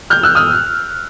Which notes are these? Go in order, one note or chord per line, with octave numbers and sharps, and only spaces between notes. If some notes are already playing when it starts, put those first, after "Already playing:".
F6 G6
E6 F#6
D#6 F6